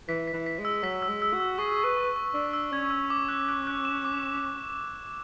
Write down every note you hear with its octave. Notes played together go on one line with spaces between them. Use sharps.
E3 B6
B6
E3
B6
G#3
E6
F#3 B6
E6
G#3
E6
F#4
E6
G#4 C#6
C#6
B4
C#6
C#6
D4 E6
E6
C#4 G#6
E6
D6
F#6
F#6
F#6
E7
D6